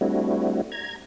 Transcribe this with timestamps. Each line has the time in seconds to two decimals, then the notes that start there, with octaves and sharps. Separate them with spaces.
0.01 G3 A3 C4 D4 E4 F#4
0.72 A#5 G#6